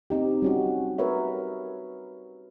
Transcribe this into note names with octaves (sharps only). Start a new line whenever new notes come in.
C4 D#4 G4
G3 C#4 F#4
F#4 A#4 B4 C#5 E5